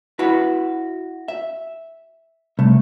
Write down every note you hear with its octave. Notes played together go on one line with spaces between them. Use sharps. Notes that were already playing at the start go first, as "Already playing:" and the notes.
E4 F#4 B4
E5
C2 A3